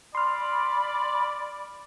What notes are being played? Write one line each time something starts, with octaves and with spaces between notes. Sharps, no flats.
D5 B5 C6 F6